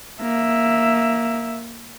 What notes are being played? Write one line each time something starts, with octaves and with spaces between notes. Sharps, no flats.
A#3 E5